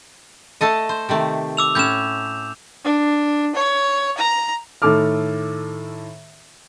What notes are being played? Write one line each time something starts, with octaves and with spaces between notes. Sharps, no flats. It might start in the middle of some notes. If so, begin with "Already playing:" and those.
A3 A4 D#5
C5
C3 D#3 A3
D6 E6 F7
A2 C#4 G6 E7
D4
C#5
A#5
A2 D#3 A4 D6 F6